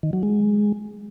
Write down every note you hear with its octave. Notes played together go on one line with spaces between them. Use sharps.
D#3
F#3
G#3